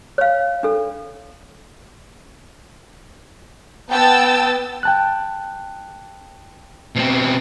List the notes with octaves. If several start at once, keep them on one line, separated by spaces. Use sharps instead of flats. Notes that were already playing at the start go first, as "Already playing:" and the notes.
C#5 F5
D4 A4
B3 G5 A5 E6 A6
G5 A5 F#6
B2 C4